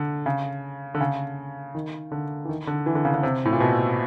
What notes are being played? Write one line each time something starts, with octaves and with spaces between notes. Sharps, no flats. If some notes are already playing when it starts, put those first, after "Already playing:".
Already playing: D3
C#3
D3
C#3
D#3
D3
E3
D#3
D3
E3
D3
C#3
D3
C3
A2
A#2
B2